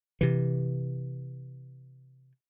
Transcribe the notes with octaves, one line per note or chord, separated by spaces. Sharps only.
C3 E3